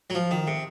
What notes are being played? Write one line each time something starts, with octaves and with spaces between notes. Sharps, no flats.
F#3
F3
D#3
C3